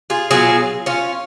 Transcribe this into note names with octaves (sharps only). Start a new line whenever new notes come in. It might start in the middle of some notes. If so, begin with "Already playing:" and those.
F4 G#4
B2 F#3 F4 G#4
C#4 F4